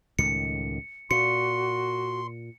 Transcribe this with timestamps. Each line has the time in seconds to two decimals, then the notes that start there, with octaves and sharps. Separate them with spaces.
0.19 C#2 A2 D#3 C#7
1.11 A#2 F#4 C6 C#7